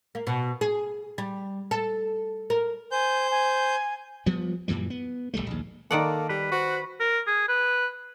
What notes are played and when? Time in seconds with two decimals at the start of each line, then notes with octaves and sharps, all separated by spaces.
0.15 A#3
0.27 B2
0.61 G#4
1.18 G3
1.71 A4
2.50 A#4
2.92 C5 G#5 G6
3.31 G#5
4.26 F3 G3 B3
4.68 F#2 A#2 E3 G3
4.90 B3
5.34 D1 C2 G3 A3
5.47 A#1 D#2
5.91 D#3 A#3 A4 D5 F#5
6.29 G3 B4
6.51 F#4 C5
7.00 A#4
7.27 G#4
7.48 B4